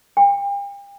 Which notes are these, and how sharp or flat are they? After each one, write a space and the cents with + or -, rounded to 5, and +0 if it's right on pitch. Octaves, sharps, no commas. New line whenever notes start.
G5 +40